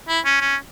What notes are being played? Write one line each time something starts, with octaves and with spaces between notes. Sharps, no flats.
E4
C#4
C#4